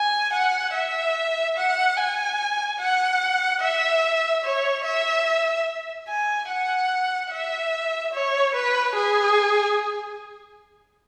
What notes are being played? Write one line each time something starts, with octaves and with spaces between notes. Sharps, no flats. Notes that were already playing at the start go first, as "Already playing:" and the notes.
Already playing: G#5
F#5
E5
F#5
G#5
F#5
E5
C#5
E5
G#5
F#5
E5
C#5
B4
G#4